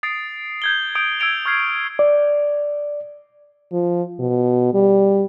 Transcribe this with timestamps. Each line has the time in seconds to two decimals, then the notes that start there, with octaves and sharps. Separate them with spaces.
0.03 D#6 A6 C7 D7
0.62 G6 G#6 G7
0.95 D#6 G6 D7
1.20 E6 G#6 D7 F7
1.45 C#6 F6 G#6 C7
1.99 D5
3.72 F3
4.20 B2
4.74 G3